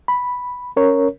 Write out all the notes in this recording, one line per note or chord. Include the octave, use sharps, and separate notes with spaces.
B5
C#4 A#4 C#5